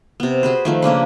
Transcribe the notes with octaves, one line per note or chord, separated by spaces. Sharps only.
C3 B3
F#4 G#4 B4 C5
D#3 F3 A3
C#3 A#3 D4 B4